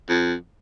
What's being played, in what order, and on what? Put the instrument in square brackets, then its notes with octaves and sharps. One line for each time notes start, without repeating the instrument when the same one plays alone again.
[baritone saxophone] F2